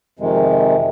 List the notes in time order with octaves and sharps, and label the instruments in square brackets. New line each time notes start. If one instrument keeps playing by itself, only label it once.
[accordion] F2 C3 D#3 G#3